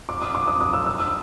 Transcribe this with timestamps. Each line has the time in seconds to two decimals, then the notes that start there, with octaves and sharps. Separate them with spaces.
0.09 D6
0.22 D#6
0.35 D6
0.47 D#6
0.61 D#6
0.73 E6
0.86 E6
1.00 E6